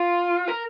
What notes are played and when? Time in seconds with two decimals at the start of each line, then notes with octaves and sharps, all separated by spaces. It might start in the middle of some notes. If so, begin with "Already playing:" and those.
Already playing: F4
0.48 A#4